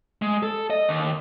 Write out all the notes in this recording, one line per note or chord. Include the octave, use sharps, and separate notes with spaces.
G#3
A4
D#5
D#2